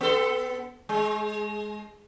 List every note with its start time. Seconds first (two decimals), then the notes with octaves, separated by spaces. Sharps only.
0.01 B3 A4
0.89 G#3